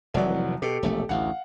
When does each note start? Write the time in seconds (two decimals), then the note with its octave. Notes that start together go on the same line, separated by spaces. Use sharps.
0.14 F1 C2 C3 E3 F#3 D5
0.62 B2 G4 A4
0.83 E1 A#1 A3
1.09 A1 D2 F5 F#5